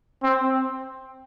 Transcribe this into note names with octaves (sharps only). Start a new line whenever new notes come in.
C4